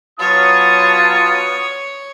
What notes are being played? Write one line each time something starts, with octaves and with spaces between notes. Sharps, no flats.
F#3 B3 F4 C#5 A5 D#6